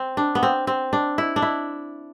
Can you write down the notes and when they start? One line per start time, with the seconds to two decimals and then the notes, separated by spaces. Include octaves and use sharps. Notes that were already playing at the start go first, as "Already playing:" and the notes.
Already playing: C4
0.17 D4
0.35 B3
0.43 C4
0.67 C4
0.93 D4
1.18 E4
1.36 D4
1.42 E4